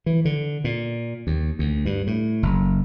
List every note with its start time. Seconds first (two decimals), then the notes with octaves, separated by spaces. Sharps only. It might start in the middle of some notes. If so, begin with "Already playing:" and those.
0.06 E3
0.25 D3
0.64 A#2
1.27 D#2
1.59 D2
1.86 G2
2.07 A2
2.43 F#1